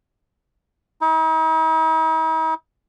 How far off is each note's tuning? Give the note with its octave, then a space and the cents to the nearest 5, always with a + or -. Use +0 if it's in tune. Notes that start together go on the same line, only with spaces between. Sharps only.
D#4 +45